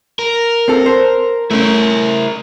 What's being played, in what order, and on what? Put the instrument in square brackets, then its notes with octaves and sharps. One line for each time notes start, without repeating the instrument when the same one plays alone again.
[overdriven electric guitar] A#4
[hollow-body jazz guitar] C4 A4
C5
[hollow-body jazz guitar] A3 C#4 [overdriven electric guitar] E4 A#4